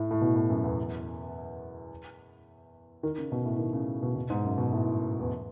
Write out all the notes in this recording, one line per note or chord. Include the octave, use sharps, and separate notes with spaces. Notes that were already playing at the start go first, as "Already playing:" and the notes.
Already playing: A2
A2
B2
A2
F#2
E2
D#3
C#3
B2
A2
D#3
C#3
B2
B2
G#2
F#2
B2
A2
E2